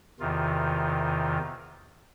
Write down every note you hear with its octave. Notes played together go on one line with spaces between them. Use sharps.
E2 C3 D#3 F4